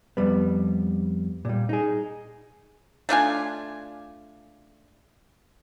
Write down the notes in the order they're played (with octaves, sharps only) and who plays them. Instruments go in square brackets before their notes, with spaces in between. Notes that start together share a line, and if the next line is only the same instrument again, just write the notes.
[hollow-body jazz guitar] F2 G3 B3
A#2 G3
D#4 G#4
[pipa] A3 D4 F4 G#5